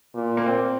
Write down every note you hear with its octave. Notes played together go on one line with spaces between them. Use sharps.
A#2
A#3
C4